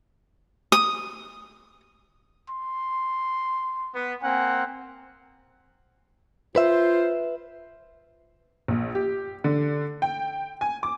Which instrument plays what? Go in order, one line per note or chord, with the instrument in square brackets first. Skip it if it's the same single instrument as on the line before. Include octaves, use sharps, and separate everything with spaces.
[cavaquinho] D#6
[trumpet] C6
[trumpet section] B3
[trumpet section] A#3 C4 F#5 [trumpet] G#5
[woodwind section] F4 C5 [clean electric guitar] B4 E5
[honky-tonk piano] A#1
G4
D3
G5
G#5
D6